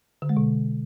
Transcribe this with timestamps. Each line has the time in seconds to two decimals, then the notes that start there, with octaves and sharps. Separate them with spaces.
0.22 D3
0.29 G#3
0.37 B2